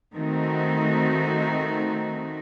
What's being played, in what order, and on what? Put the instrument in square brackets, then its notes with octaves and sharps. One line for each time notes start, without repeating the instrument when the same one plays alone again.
[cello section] D#3 A3 C4 D#4 F#4